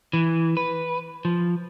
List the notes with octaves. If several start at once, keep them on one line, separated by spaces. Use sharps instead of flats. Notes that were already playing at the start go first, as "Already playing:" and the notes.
E3
B4
F3